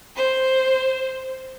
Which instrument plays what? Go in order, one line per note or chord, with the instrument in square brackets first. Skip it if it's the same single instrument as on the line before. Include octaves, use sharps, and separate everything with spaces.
[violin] C5